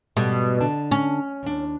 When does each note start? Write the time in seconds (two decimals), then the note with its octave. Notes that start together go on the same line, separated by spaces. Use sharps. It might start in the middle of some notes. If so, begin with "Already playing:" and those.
0.17 G#2 B2 G3 A3
0.61 D3 D4 A5
0.91 C#4
1.43 D#2 D4